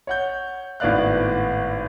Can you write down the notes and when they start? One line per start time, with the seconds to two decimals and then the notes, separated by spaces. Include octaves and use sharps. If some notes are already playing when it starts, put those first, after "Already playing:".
0.07 C#5 F#5 G6
0.80 G#1 A2 B3 D5 F5 F#6